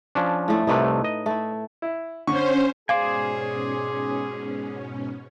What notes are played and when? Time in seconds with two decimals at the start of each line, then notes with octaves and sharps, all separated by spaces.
0.15 F3 C#4 D4
0.48 A2 A3 E4
0.67 C2 C3 A3 D#4 B4 C#5
1.04 D#5
1.26 A3 E4
1.82 E4
2.27 D3 C#4 C5 C#6
2.89 G#2 B2 C#4 G#4 C5 D5 F5 G#5